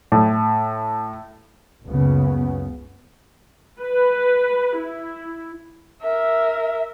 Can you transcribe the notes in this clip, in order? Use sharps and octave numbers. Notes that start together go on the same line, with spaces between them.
A2
F#1 C#2 C#3 B3
B4
E4
A#4 E5